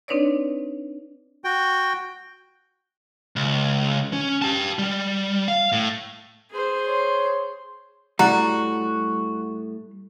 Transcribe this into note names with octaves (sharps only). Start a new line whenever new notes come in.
C4 D4 D#4 B4 C#5 D5
F#4 G5
C#2
C#4
G4 A5
G3
F5
A2
G#4 C5
C#5 C6
A2 G3 F#4 A#5